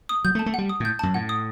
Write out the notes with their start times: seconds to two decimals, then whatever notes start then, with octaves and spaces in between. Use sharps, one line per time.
0.09 D#6
0.24 F#3 G6
0.35 A3
0.39 A5
0.46 A3
0.54 G3 F#5
0.69 D#6
0.80 A2 G6
0.99 F#2 A5
1.14 A2 F#5
1.29 D#6